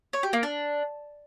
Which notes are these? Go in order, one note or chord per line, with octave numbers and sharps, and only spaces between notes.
C#5
G4
A#3
D4